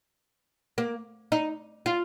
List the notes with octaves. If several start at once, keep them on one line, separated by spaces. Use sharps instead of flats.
A#3
D#4
F4